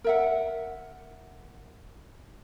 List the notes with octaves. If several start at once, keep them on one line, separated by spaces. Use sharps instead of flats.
A#4 E5 F#5